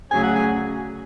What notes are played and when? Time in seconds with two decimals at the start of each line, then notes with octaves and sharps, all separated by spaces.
0.11 D2 C#3 F#3 C#4 G#4 G#5
0.23 F#5
0.36 G#5